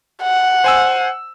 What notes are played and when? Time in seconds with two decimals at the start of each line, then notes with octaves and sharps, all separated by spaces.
0.23 F#5
0.64 C5 G#5 E6